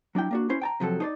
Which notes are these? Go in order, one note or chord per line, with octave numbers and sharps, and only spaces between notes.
F#3 D4 E4 G5
A#3 D4 F#4
C#4 E4 C5
G5 A5 A#5
C3 F3 F#3 A4
D#4 C5 D5